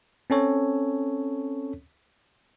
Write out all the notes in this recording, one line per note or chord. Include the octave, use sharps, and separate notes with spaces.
C4 C#4 A4 C#5